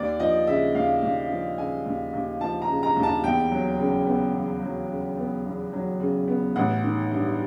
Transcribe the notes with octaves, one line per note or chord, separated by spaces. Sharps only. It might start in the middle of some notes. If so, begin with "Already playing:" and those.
Already playing: D#2 D5
F3 D#5
C#3 E5
D#2 F5
D#2
F3
C#3 G#5
D#2
D#2
F3 A5
A#5
C#3
A#5
D#2
A5
E2 G5
F#3
C#3
B3
E2
F#3
C#3
B3
E2
F#3
C#3
B3
A1 F#5
D#3
G2